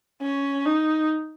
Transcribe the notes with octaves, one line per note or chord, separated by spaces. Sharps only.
C#4
D#4